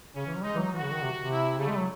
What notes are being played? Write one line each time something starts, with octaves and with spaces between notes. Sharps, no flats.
C#3 C#4
E3
F#3
G#3 D#4
E3
F#3
E3 F#4
C#3
D#3
C3
C3
E4
C#3 A3
G#3
F#3